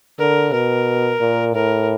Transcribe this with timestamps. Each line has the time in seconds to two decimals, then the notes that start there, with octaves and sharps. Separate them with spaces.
0.19 D3 A#4
0.52 B2 A#4
1.21 A#2
1.54 A2 A#4